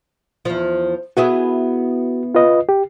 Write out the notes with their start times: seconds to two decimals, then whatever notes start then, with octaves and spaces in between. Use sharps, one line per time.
0.45 E2 F3
1.17 B3 E4 F#4 G#4
2.35 F4 B4 D#5
2.69 G4